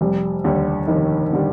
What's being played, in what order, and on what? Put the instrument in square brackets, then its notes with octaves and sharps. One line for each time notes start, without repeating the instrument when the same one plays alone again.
[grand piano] F1 [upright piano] G3
[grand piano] D#2 D3 G3
[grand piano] F1 [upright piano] D#3
[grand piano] D3 G3